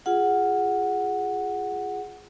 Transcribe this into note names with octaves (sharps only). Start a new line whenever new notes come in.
F4 G#4 F#5